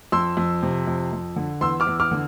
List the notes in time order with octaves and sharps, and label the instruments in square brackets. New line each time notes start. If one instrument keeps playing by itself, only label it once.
[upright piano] F2 C6 E6
F2
C3
F2
F2
D3
E2 C6 E6
D6 F6
E2
D6 F6
D3